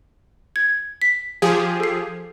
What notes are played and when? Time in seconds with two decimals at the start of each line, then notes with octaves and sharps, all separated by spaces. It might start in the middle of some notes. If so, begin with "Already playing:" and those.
0.56 G#6
1.02 B6
1.42 F3 G4 G#4
1.80 A4 C7